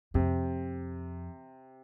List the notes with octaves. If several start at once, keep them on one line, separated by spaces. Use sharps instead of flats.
F2 C3